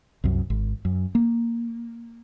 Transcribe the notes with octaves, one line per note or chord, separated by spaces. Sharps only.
C2 F#2
G#1
F#2
A#3